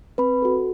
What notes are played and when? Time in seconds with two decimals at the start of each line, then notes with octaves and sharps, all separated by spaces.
0.18 C4 B4 B5
0.42 F#4 A4